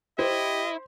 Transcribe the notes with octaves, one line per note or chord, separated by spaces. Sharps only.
E4 G4 C5 D#5